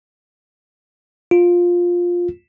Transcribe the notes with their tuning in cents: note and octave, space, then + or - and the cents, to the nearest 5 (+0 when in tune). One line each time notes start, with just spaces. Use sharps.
F4 +10